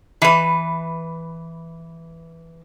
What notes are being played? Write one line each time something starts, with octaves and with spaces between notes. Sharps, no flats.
E3 B4